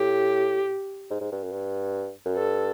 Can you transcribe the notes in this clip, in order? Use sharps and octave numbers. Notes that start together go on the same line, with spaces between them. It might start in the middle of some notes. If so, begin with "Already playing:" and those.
Already playing: A2 G4
G#2
G#2
G2
F#2
G2
F#2
G2 A4